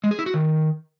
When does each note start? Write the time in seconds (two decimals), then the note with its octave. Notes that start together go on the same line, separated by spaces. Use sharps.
0.04 G#3
0.11 G#4
0.19 E4
0.26 F#4
0.34 D#3